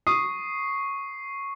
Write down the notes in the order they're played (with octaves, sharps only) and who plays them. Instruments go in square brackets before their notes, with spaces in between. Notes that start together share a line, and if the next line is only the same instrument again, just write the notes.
[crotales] C#6 C7 [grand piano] D#6